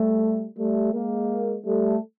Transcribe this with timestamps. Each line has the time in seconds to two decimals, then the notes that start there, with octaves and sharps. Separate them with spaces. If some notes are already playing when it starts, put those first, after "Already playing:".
Already playing: G3 A3
0.57 G3 A3
0.92 G#3 A#3
1.64 G3 A3